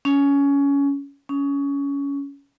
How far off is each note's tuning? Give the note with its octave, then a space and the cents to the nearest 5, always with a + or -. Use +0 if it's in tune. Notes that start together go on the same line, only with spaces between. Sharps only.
C#4 +20
C#4 +20